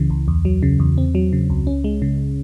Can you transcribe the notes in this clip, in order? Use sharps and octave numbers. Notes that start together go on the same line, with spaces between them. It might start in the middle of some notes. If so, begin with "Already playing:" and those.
Already playing: C#2 C#3 E3
C#2
E2
F#3
C#3
E2
C4
F#3
C#3
C#2
C#4
G#3
C#3